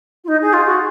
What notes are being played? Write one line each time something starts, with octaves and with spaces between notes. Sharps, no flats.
F4
D#4
G#4
F4
F#4